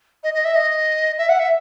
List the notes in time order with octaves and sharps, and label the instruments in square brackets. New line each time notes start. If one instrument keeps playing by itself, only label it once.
[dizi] D#5
D#5
E5
D#5
E5
F#5
E5